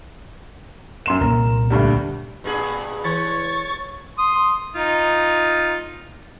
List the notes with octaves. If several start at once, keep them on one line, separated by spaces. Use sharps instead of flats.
F#2 C6 E7
C2 A#2 A#3 A#4
D2 G2 G3
G2 A#2 G#4
E3 C#5 C#6 A6
C6 D#6
D#4 F4